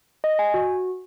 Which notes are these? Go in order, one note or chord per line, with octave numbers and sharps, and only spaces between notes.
D#5
G#5
F#4